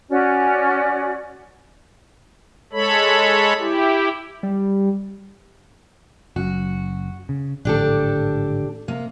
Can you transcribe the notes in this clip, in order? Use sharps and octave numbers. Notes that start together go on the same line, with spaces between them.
C#4 F#4 D5
G#3 A4 C#5 B5
E4 G4
G3
F#1 F#2 F#4
C#3
G#1 A2 D3 D4 G4 A4
C3 A#3